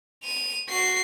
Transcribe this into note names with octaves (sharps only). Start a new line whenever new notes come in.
D#7 F7
F#4 C7